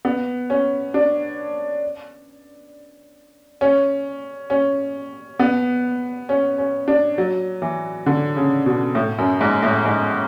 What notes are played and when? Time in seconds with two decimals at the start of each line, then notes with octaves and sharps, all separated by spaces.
0.05 B3
0.50 C#4
0.94 D4
3.61 C#4
4.50 C#4
5.39 B3
6.29 C#4
6.58 C#4
6.88 D4
7.18 F#3
7.62 E3
8.06 D3
8.36 C#3
8.66 B2
8.95 A2
9.18 F#2
9.41 G#2
9.63 A2
9.85 G#2